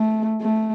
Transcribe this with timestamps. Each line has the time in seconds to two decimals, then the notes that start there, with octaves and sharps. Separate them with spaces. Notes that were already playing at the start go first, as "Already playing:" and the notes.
Already playing: A3
0.41 A3